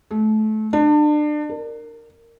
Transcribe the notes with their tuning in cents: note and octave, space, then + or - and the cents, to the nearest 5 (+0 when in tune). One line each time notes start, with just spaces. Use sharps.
A3 -25
D4 +30
A#4 -15